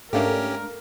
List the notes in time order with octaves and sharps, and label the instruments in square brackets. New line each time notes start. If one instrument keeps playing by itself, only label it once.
[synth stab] G#2 A3 D4 [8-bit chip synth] C#4 G4 [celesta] A4 F5 [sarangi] A#4